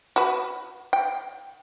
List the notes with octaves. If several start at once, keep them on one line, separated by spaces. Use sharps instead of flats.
F#4 B4
G5